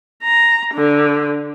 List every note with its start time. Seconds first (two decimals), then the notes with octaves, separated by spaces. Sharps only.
0.22 A#5
0.75 D3